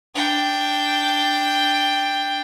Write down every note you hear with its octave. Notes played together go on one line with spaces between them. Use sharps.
D4 G5